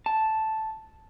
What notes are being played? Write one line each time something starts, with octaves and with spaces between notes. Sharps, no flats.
A5